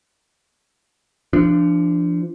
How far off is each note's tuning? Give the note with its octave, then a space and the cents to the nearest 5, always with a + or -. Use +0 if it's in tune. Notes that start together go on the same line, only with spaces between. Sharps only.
F3 -30 D4 +0